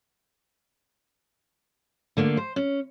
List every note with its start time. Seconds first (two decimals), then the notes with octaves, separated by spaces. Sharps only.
2.17 D3 A3 A#3 F4
2.37 C5
2.56 C#4